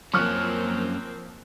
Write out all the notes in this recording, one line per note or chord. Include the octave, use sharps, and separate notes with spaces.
F#2 F3 A#3 C4 C#4 C#6 F6 F#6